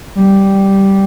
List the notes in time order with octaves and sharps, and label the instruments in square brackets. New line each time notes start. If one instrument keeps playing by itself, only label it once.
[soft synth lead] G3